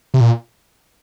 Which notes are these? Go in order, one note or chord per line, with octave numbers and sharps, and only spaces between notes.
C3
A#2